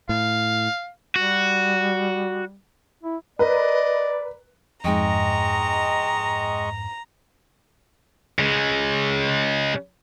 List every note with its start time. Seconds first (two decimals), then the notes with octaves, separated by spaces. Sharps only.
0.09 A2 F5
1.16 G3 F#4
3.03 E4
3.39 A#4 B4 D5 D#5
4.84 F2 G#2 G#3 D#5 G5 A#5 C#6
8.39 C#3 G#3